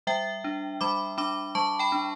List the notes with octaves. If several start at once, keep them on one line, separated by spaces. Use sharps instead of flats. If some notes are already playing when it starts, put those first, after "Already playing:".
G3 E5 G5
D4
G3 B5 D6
D4 B5 D6
G3 A5 C#6
G5 B5
D4